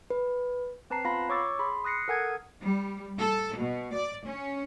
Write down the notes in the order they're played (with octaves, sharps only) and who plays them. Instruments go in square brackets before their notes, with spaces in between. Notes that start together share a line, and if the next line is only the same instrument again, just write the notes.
[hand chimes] B4
[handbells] C4 B4 A5 A#5 C7
B3 F4 F5 A#5 B5 A#6
C#5 C#6 D6 E6 A6
G#4 B5 C6
D#6 F#6 A#6 C7 C#7
A4 A#4 F#5 G#5 D#6 G#6
[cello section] G3
A4
B2
D5
C#4